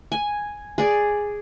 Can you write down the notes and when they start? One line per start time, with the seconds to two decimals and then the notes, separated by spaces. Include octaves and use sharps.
0.12 G#5
0.78 G#4 D5